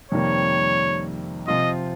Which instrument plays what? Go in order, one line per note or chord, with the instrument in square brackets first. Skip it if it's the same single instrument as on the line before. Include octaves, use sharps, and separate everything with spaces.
[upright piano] F2 C3 D#3 G3 A#3 [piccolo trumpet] C#5
[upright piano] C3 F3 C4 F4 [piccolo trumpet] D#5